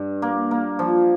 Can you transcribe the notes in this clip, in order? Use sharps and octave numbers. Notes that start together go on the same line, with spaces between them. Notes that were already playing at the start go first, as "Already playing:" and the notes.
Already playing: G2
A#3
A#3
F3